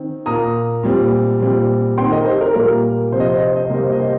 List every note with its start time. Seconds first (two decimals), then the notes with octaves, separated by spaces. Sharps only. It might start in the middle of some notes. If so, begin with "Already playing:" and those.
Already playing: D#3 C4
0.26 A#2 A#3 A#5 D#6
0.83 A#2 G3 C4
1.40 A#2 G3 C4
1.98 D#3 C4 G5 C6
2.12 A#4 D#5
2.26 G4 C5
2.41 A#4
2.55 A#2 G3 A#3 A#4
3.12 C3 F3 C4 C5
3.20 D#5
3.30 C5
3.38 D#5
3.47 C5
3.56 D#5
3.65 C5
3.70 C3 G3 A#3 D#5
3.83 C5
3.92 D#5
4.00 G4 C5